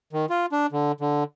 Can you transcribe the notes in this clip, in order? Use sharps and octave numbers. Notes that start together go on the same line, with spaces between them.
D#3
F4
D4
D3
D3